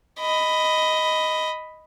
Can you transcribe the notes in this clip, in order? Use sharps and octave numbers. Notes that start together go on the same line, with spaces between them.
D#5 B5